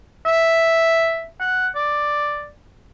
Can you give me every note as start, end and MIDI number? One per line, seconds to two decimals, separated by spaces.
0.26 1.26 76
1.40 1.67 78
1.76 2.48 74